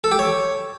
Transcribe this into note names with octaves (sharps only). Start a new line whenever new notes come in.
A4
G4
C#5